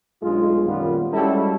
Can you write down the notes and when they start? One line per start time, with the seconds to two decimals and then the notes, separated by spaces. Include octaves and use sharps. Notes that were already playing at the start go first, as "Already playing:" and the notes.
0.23 B1 G2 G#3 F4
0.65 F#2 A#2 D#3 G3 B3 F4
1.13 G3 G#3 C#4 E4 F#4 A4